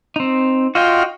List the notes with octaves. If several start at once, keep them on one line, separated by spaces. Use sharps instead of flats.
C4 D#4
F4 F#4 D#5 G5